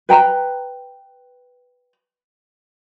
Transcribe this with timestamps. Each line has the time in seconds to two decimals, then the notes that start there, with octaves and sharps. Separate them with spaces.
0.09 B4 G5 A#5